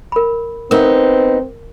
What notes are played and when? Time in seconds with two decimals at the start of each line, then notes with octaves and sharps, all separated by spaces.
0.12 A#4 B5
0.71 B3 C4 D#4 A#4